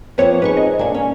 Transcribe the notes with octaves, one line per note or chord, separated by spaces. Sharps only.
F3 A#3 C4 B4 C#5
D#4 G#4 B4 C5 C#6
D#5
A#2 A#3 D4 G#5
C#4